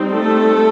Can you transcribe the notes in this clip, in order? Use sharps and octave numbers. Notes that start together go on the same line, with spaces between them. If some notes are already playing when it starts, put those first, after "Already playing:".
Already playing: G3 C4 D#4
A3 A4